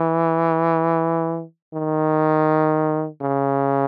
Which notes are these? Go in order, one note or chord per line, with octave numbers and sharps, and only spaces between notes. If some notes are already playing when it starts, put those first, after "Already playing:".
Already playing: E3
D#3
C#3